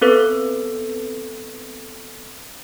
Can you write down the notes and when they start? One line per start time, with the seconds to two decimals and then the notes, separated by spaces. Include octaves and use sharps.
0.01 B3 C4 A4 B4